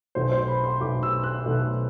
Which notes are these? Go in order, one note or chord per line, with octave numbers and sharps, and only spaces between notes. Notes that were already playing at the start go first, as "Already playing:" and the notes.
B1 B2 A3 C5
C5
B5
C6
B1 B2 A3 D6
E6
F#6
B1 B2 A3